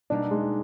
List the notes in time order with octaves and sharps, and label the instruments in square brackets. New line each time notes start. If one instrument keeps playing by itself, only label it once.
[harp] B2 G3 A#3 D#4 [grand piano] D4
[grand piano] G#3